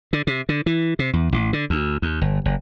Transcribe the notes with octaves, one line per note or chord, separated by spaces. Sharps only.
D3
C3
D3
E3
C3
E2
A1
D3
D2
D#2
G1
F#1